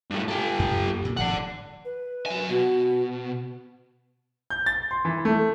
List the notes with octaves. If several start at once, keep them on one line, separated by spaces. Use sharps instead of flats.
G2 A3
G4 A4
F#2
A#3
D2 A#2
D1 G#1 F3 D5 F#5
B4
F#3 G#5
B2 F#4
G6
A6
C6
E3
A3